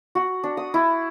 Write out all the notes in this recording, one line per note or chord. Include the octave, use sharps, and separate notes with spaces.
F#4
D4
D#6
E4